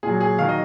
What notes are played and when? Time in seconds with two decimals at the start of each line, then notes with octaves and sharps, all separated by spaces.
0.03 A#2 G#4
0.08 F#3
0.21 G#4
0.38 D#3 F#3 F5
0.49 D#5